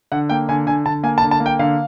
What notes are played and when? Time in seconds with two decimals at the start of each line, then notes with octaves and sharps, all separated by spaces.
0.12 D3 F#5
0.29 A#3 G5
0.49 D3 G#5
0.67 D3 G#5
0.86 D3 A5
1.03 A#3 G#5
1.18 A5
1.23 D3
1.31 A5
1.40 A#3
1.46 G5
1.59 D3 F5